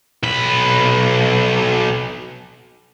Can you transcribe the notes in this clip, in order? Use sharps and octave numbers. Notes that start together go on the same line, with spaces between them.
B1 B5